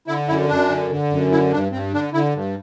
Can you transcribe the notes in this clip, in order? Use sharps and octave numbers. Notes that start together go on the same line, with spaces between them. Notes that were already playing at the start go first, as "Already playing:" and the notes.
D3 E4
F#2 E4
F#2 D4
D3
D3
F#2
D3 E4
G2 D4
G2 C4
D3 D4
D3 E4
G2